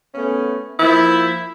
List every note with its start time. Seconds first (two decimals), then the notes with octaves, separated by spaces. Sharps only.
0.15 A3 B3 C#4
0.80 F3 A#3 E4